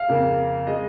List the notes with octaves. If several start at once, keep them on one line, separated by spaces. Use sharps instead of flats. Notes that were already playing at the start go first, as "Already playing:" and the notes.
Already playing: F5
F2 C#3 A#3
G#3 D#5